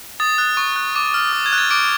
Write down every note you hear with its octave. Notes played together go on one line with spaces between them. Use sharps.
D#6 A6
F#6
C#6
F#6
D6
F6
D#6
G#6
F#6
A6
D6 D7